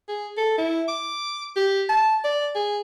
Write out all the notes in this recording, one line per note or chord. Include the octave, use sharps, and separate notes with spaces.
G#4
A4
E4
D6
G4
A5
D5
G#4